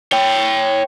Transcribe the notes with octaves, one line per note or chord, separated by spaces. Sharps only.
C#5 G5